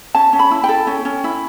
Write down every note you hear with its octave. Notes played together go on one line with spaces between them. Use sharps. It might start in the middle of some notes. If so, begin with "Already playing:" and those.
C#4 A5
C#4
B5
E4
A4 G5
C#4
C#4
E4